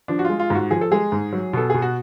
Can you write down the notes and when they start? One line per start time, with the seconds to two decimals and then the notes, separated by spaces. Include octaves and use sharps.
0.08 F3 D4
0.19 F#4
0.25 F4
0.30 G#3
0.40 F4
0.50 G#2 F#4
0.71 F3 G#4
0.81 A4
0.91 G#3 G#4
1.12 G#2
1.33 F#3
1.53 B2 A4
1.70 B2 G#4
1.82 F#4